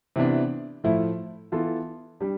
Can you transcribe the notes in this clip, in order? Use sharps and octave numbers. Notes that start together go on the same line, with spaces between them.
C3 E3 B3 D4
A2 F3 A3 E4
E3 B3 F4 A4
G3 D4 G4